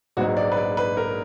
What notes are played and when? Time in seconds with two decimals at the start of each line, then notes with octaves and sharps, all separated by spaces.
0.17 A#1 G#2 F#3 B3 F#4
0.37 D5
0.52 B4
0.57 D5
0.77 B4
0.97 A#4